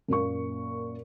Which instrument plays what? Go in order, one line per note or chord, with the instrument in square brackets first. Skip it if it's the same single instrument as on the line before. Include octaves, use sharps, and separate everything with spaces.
[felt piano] F#2 A#2 A#3 C#6